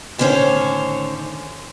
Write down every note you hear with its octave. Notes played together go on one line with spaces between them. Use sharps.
A2 D3 D#3 C#4 C5 C#5